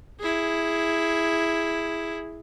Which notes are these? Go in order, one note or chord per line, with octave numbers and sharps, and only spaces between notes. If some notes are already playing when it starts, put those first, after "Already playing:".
E4 G#4